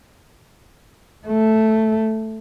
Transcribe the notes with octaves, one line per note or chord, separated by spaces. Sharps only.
A3